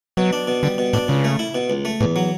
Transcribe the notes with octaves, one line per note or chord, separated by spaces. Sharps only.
B2 F#3
D4
B2
D3 G3
B2
A2 D4
C#2 C#3
A3
E4
B2
C#2
A3
E2 A2
F#3